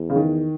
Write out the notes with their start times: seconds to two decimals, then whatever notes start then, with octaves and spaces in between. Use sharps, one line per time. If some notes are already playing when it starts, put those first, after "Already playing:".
Already playing: E2
0.10 C#3
0.16 D#3